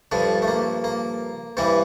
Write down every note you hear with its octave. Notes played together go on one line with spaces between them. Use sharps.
G2 D3 F3 D4
A3
A#3
A#3
G2 E3 G3 C4